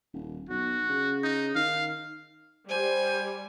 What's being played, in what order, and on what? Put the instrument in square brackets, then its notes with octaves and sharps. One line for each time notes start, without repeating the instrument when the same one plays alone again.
[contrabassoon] D#1
[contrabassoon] B1 [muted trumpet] F#4
[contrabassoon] C#3
[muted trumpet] D#4
[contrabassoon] D#3 [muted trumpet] F5
[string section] G3 [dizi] C5 [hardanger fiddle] G#5